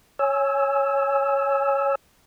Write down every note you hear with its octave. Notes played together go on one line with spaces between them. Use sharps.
C#5 G#5 E6